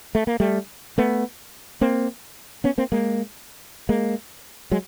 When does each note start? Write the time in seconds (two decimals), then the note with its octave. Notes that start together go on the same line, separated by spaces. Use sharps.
0.15 A3
0.27 A#3
0.40 G3 A3
0.98 A3 B3
1.81 A#3 C4
2.64 B3 C#4
2.78 A#3 C4
2.92 G#3 A#3
3.89 G#3 A#3
4.72 F#3 G#3